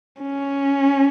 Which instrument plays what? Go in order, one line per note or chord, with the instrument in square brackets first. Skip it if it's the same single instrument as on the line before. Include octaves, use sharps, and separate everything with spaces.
[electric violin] C#4